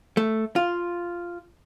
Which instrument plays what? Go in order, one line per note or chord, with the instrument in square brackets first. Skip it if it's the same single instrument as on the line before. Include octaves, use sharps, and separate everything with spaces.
[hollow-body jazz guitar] A3
F4